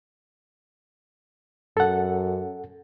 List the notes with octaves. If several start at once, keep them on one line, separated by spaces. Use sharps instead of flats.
F#2 A4 F#5